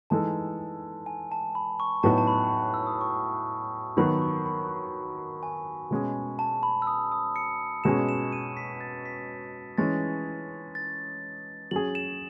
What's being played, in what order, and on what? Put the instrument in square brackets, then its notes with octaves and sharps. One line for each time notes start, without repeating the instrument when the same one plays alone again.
[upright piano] E3 G#3 D#4 A4 [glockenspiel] A5
[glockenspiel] G#5
A5
B5
C#6
[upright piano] A2 F#3 B3 D#4 F#4 [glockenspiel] A5
[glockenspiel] A5
B5
E6
D#6
C#6
[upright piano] D#3 F#3 B3 F#4 [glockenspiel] B5
[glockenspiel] C#6
B5
G#5
[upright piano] B2 G#3 C#4 G#4
[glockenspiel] A5
B5
E6
D#6
D#6
C#7
[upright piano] B2 G#3 C#4 G#4 [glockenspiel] E7
[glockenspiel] E7
D#7
B6
A6
B6
[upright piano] E3 G#3 C#4 [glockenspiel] A6
[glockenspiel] A6
[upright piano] F#3 C#4 G#4 [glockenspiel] F#7
[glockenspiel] E7